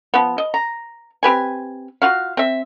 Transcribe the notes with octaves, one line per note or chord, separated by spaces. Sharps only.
F3 B3
D#5
A#5
C4 G4 B4 G#5
F4 F#4 F5
C4 E5